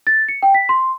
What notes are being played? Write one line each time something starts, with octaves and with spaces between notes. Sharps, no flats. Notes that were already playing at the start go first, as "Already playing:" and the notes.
A6
C#7
G5
B6
C6